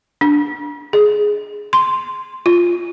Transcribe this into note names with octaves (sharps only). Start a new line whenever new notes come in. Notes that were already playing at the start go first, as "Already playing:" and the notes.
D4
G#4
C6
F4